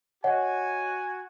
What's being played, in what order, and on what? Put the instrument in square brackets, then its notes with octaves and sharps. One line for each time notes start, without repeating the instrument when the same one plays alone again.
[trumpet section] F#4 G#5 [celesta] C#5 D#5 F#5